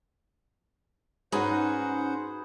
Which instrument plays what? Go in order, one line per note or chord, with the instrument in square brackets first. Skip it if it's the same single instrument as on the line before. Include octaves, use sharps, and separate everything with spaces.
[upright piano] G#2 [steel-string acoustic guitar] C#4 D#4 [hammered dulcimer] F#4 G#4 B4 [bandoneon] C5 F#5